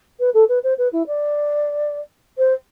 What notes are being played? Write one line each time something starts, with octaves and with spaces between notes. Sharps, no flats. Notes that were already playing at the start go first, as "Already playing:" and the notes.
B4
A4
B4
C5
B4
E4
D5
C5